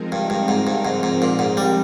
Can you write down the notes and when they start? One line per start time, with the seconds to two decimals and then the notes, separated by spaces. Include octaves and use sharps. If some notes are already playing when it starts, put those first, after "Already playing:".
Already playing: F3 G#3 C4 D#4 A#4
0.12 G2
0.30 G2
0.48 G#2
0.67 G2
0.85 G#2
1.03 G#2
1.22 A#2
1.39 G#2
1.57 G3